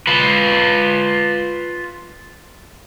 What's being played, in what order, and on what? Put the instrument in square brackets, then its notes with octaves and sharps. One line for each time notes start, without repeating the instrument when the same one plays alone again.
[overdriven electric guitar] F4 B4